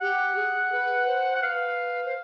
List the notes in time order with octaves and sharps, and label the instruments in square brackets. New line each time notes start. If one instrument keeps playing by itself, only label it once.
[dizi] G4 [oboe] F#5
[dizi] G#4
B4
C5
[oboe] F#5
[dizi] B4 [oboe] F5
[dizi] C5